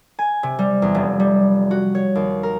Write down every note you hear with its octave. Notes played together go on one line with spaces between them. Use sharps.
G#5
C3
G3
E2
F1
G3
F#4
C#5
D#2
A#4